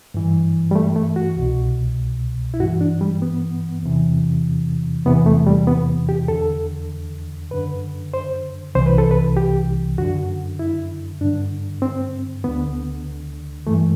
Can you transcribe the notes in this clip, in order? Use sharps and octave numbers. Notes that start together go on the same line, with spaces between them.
G2 E3
G3
A3
A3
F#4
C2 B2
E4
G2 E3 F#4
D4
G3
B3
E2 C3 E3
E2 C3 E3 B3
A3
G3
B3
G4
E2 D3 A4
F#2 D3 B4
C5
C2 C3 E3 C5
B4
A4
B4
G4
F#2 D3 F#4
E4
G2 D3 D4
C4
D2 D3 B3
G2 E3 A3